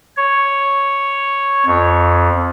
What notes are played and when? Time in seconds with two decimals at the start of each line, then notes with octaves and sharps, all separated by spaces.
0.17 C#5
1.66 F2